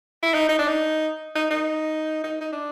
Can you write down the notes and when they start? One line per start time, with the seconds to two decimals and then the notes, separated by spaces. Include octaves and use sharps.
0.23 E4
0.34 D#4
0.49 D#4
0.59 D4
0.68 D#4
1.35 D#4
1.50 D#4
2.24 D#4
2.41 D#4
2.52 D4